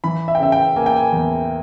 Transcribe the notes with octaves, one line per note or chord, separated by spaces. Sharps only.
E3 B5
E5
G5
C#3 E5
G5
A#3 G#5
G5
G#5
E2